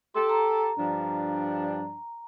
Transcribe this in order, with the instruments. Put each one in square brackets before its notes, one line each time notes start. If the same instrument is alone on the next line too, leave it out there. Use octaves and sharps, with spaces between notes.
[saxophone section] G4 A4 [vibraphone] C6
[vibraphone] A#5
[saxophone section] G2 F3 D4